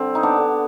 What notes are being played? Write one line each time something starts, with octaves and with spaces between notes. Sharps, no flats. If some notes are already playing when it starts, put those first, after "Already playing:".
Already playing: D3 G3 C4
D#4
B3 D4
D3